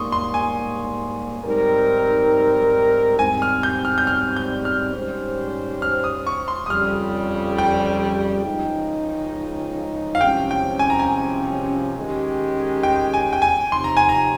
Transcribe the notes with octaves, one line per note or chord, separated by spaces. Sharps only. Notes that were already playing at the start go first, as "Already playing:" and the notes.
Already playing: G#2 G3 A#3 C6 C#6 D#6
C6
G#5
G#2 G3 C4 D#4 A#4
G#2 G3 C4 G#5
F6
G6
F6
G6
F6
G6
F6
G#2 G3 C#4 G4 C5
F6
D#6
C#6
C6
D#6
F2 C#3 G3 F6
G5
C#2 C#3 F3 G#3 D#4
F5
C2 C3 F3 G#3 C#4 G5
G5
G#5
A#5
G#5
D#3 G#3 C#4 G4
G5
G#5
G5
G#5
C3 F3 C4 D#4 C6
A#5
G#5
A#5